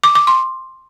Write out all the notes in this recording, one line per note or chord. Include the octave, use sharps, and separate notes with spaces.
D6
D6
C6